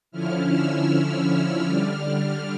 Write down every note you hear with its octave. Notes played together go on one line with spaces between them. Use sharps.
D3 F3 C#4 E4 F6
E6
F6
D3 G3 D4